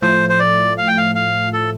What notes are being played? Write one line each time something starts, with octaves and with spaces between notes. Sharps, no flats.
A2 F3 A3 C5
C5
D5
F5
G5
F5
F5
A4